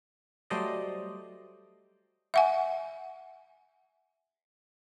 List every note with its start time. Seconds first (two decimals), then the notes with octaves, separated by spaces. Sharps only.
0.50 F#3 G3 A3 C5 D5 D#5
2.34 E5 F#5 G#5